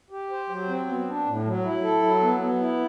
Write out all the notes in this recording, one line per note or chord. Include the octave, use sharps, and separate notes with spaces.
G4
C5
F#3
C4
B3
D4
A2
F#3
E4
A4
F#3
B3
B3
E4